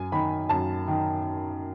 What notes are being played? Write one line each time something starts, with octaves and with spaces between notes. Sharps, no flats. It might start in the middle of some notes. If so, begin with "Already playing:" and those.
Already playing: F#2 G#5
D#3 B5
F#2 A5
D#3